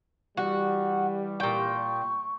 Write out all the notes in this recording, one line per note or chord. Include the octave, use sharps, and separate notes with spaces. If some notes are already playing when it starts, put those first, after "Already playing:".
E3 G3 F#4
A#2 G5 C#6